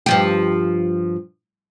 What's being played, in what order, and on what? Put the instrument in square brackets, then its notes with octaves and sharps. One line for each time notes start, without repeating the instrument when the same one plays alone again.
[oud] G2 F3 G4